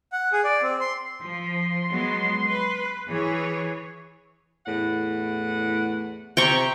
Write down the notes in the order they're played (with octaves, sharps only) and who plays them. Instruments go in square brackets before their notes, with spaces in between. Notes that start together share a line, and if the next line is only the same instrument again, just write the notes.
[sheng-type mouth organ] F#5
G#4
D5
C4
C6
[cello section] F3 [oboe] C6
[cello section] F#3 G#3 B3
B4
E3 G#4 C#5
[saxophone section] E2 A2 F#5
[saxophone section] C3 [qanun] G5 A#5 C#6